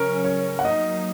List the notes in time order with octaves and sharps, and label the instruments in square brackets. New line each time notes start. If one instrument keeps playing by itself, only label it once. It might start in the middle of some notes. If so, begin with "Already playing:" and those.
Already playing: [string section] C#3 F#3 C#4 [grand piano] A#4
[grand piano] C#5
F#5
[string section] F#3 A#3 D#4 [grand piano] D#5